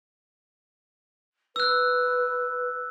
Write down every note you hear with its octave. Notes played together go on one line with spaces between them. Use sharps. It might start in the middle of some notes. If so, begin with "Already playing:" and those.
B4 E6 F#6